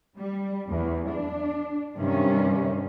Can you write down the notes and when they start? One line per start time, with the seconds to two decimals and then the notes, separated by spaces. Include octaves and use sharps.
0.17 G3
0.68 E2
1.10 D4
1.95 G2 C3 D#3 G3 C#4